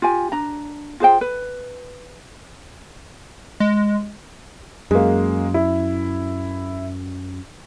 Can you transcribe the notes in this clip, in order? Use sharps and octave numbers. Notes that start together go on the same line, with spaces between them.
F4 G4 G#5
D4 A#5
F4 G#4 C5 G5
B4
G#3
F#2 G#3 A#3
E4